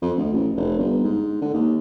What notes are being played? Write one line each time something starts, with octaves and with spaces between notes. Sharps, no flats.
F2
D2
A1
F1
G1
G#2
D3
D#2